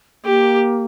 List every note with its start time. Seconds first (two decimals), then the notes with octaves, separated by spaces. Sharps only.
0.25 A#3 G4